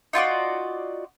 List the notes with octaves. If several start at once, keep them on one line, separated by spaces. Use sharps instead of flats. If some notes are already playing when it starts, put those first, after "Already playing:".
D#4 F4 F#4 D5